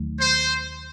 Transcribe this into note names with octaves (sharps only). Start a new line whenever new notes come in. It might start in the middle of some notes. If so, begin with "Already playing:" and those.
Already playing: D#2 D#3 F#3 A3
C5